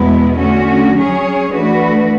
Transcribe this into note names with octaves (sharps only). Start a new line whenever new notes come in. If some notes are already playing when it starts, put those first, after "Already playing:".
Already playing: E2 B2 G#3 B3 E4
D3 A3 C#4 F#4
F#3 C#4 G#4 C#5
E3 A3 D4 F#4 B4